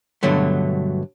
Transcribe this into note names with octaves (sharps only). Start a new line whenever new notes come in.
G2 B2 D3 F#3 A3